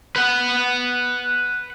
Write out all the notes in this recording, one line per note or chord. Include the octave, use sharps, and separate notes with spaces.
B4 F#5